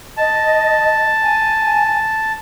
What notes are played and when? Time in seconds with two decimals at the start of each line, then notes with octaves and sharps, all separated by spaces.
0.17 D#5 A5
1.22 G#5